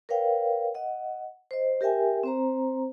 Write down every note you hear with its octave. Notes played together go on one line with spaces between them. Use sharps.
A#4 B4 C#5 F5 G5
D#5 F#5
C5 D#5
G4 A#4 E5 G5 G#5
C4 C5 A#5